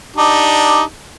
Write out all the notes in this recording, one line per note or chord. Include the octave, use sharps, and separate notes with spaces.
D4 D#4 G4